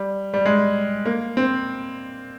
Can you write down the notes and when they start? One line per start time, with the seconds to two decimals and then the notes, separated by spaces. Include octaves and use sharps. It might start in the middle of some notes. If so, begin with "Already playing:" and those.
Already playing: G3
0.34 G3
0.46 G#3
1.06 A#3
1.37 C4